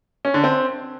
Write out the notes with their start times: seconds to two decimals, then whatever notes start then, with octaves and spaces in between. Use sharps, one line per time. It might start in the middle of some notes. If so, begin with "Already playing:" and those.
0.25 C#4
0.34 D3
0.44 C4